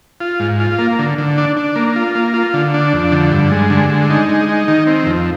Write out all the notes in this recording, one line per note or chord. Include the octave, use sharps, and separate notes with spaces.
F4
G#2
F4
A#3
D3
D3
D4
D4
A#3
F4
A#3
F4
D3
D4
F2
D3
G2
G#3
D3
G#3
D#4
G#3
D#4
D#3
C4
F2